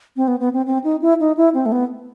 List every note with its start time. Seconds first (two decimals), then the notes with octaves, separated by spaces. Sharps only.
0.17 C4
0.28 B3
0.40 B3
0.53 C4
0.66 C4
0.84 D#4
1.02 E4
1.20 D#4
1.37 E4
1.54 C4
1.66 A3
1.72 B3